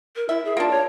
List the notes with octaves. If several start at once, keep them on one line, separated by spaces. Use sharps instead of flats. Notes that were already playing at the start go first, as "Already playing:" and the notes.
A#4
E4 E5
G#4
A#3 D4 F4
C#5